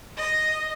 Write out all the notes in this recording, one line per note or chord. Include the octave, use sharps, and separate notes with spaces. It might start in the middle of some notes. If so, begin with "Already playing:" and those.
D#5